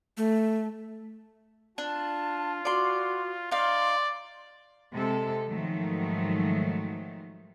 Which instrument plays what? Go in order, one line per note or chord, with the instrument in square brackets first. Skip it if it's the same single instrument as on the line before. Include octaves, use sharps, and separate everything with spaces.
[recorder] A3
[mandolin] D4 [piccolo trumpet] F4 [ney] A5
[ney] F#4 [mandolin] D5 C6
[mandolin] D#4 F5 [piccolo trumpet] D5 [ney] C6
[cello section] C3 G#3 A4
G#2 D#3 F3 F#3 G#3 A3